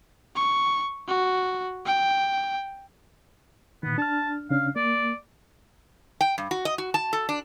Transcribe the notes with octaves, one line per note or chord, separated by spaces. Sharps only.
C#6
F#4
G5
A#2 D#3 B3
D4 A5 F6
C#3 C#4 D4 F5
A#3 D5
G5
G2
F#4
D#5
F#4
A5
A4
D4